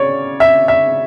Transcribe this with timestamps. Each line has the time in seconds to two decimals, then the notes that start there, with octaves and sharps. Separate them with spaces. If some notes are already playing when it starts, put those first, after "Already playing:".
Already playing: C#3 C#5 D5
0.40 E5
0.68 E5